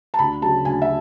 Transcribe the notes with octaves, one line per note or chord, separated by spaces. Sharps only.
A5
D2 B5
C#3 F#3 A5
D2 G#5
E5